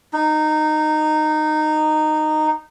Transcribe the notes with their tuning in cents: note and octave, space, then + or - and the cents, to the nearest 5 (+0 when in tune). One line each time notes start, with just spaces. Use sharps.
D#4 -15